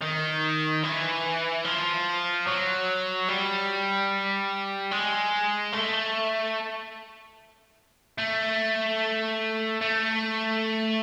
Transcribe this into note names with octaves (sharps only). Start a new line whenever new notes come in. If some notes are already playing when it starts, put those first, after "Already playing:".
D#3
E3
F3
F#3
G3
G#3
A3
A3
A3